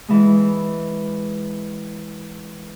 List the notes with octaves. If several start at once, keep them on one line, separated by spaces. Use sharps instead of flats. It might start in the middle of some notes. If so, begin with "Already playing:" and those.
E3 G#3